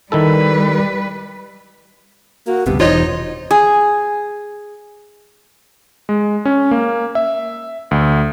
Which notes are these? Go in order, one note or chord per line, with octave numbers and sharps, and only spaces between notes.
D#3 G3 E4 A4 B4
A#3 F#4
D2 G2 C3 B3 G4
E1 A#1 E3 D#4 F4 C5 C#5 D#5
G#4
G#3
C#4
A#3
E5
D2